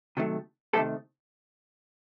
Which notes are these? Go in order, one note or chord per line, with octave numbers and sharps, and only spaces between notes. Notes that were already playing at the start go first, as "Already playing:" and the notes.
C3 D#3 F#3 A3
C3 D#3 F#3 A3 G4 A4